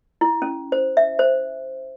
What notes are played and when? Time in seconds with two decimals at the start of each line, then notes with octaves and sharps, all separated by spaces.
0.21 E4
0.42 C#4
0.72 C5
0.97 E5
1.19 C5